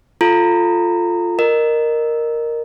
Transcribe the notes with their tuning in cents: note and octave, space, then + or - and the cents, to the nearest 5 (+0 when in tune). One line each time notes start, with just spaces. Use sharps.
F4 +0 A4 +0 A#5 -20
A#4 +0 D#5 -25